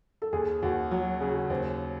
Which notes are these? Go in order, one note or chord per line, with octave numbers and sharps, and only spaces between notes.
A4
D#2 G#4
D#2 F#4
F#3 F#4
C#3 G#4
F#4
G#4
D#2 C5